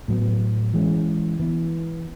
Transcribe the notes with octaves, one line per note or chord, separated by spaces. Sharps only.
A2 F#3 B3
E3 G#3 C#4
E3 B3